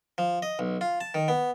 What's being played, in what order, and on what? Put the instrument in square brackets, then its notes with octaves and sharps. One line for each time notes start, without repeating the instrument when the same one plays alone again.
[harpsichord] F3
D#5
B1
F4
A5
D#3
B3